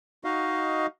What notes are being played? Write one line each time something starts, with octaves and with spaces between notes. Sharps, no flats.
D#4 F#4 D#5 F5